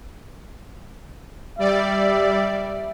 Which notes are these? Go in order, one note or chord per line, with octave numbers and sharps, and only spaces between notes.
G3 D5 E5